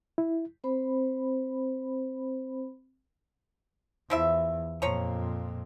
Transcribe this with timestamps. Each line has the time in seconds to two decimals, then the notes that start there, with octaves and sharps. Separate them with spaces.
0.18 E4
0.64 C4 C5 B5
4.10 E2 F3 E4 E5
4.82 F2 A#2 F3 C#5 A#5